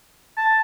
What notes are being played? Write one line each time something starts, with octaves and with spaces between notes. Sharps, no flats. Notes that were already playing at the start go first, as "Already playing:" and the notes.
A5